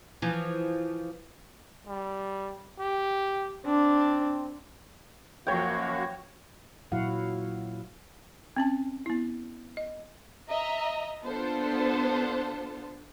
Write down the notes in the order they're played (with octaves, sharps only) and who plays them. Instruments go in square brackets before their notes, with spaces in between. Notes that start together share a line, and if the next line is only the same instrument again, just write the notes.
[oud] E3 F3
[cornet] G3
G4
[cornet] C4 [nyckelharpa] D4
[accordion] F#2 A#3 F#4 [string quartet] F3 F#3 [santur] C#5 G5
[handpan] A#2 F#3 E4 F#4 F5 F#5
[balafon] C4 C#4 A5
B3 E4
D#5
[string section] D#5 E5 A#5
B3 D4 F4 A4 C5 A5